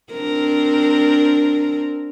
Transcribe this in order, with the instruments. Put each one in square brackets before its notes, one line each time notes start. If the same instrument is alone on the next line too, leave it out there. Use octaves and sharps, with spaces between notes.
[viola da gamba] C4 D4 A#4